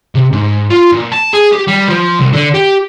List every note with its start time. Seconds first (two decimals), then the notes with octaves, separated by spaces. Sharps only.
0.15 C3
0.33 G#2
0.71 F4
0.93 A#2
1.12 A5
1.34 G#4
1.52 G4
1.67 G3
1.88 F3
2.20 C2
2.33 D3
2.54 G4